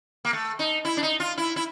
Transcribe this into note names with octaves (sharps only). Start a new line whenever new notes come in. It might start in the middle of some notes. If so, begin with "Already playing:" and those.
A#3
A3
D#4
E4
D4
D#4
F4
E4
E4